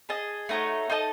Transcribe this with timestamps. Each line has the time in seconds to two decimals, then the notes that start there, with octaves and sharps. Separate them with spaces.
0.09 G#4 D#5 A5
0.49 A3 D#4 F#4 C#5
0.90 D#4 A4 D#5 A5